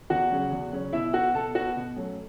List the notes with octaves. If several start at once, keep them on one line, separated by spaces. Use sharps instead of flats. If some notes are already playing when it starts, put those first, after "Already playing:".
E2 F#4 F#5
C#3 F#3 C#4
E2
C#3 F#3 C#4
B2 E4 E5
B3 F#4 F#5
B2 A4 A5
B3 F#4 F#5
B2
F#3 A3 C#4